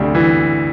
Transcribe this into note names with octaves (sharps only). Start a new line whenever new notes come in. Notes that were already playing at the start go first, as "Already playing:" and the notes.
Already playing: D2 C3 G3
E3